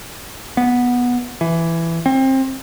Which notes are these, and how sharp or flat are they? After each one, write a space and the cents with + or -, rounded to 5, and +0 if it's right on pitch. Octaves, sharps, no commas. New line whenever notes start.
B3 -10
E3 +10
C4 +25